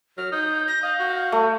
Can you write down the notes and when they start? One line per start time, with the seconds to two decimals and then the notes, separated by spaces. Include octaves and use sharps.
0.18 F#3 F6
0.32 D#4 D#6 G6
0.68 A#6
0.83 D#5 F5
0.99 F#4
1.32 A3